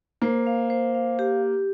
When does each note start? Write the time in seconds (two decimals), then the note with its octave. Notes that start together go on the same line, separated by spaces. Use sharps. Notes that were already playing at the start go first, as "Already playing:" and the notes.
0.22 A#3 C5
0.47 F5
0.70 C5
0.95 F5
1.19 G4